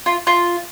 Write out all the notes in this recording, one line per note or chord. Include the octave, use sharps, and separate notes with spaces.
F4
F4